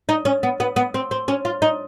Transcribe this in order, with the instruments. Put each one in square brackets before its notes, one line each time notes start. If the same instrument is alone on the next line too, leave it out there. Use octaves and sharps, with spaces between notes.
[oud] D#4
C#4
B3
B3
B3
C4
C4
C#4
F4
D#4